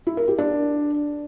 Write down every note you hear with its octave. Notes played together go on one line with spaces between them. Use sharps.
E4
A#4
G4
D4